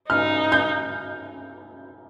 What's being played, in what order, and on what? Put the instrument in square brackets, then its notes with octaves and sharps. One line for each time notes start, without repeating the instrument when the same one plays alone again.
[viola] D#4 [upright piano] F6
[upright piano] G6